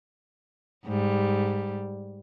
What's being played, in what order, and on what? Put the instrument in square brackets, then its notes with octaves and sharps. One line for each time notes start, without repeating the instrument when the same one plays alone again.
[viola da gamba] G#2 G3